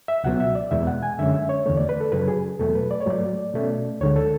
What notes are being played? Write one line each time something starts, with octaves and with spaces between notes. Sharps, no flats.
E5
C#2 B2 F#3 B3 F#5
E5
D5
E2 B2 G#3 B3 E5
F#5
G#5
F#2 D3 G#3 C#4 E5
E5
C#5
E2 D3 A3 C#5
D5
B4
A4
F#2 C#3 F#3 B4
G#4
E2 B2 F#3 A3 A4
B4
D5
C#5
G#2 F#3 A3 D5
B2 A3 C#4
D2 D3 G#3 C#5
A4